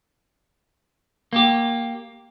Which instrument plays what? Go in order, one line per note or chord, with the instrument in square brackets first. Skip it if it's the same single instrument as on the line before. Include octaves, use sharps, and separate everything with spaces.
[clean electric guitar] A#3 G4